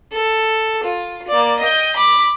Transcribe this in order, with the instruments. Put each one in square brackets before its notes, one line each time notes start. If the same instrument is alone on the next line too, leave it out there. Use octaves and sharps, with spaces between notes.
[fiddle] A4
F4
A#3 D5
D#5 G5
B5 D6